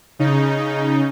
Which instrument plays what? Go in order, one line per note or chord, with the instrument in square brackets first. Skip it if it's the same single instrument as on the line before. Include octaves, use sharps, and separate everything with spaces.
[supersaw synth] C#3 D#4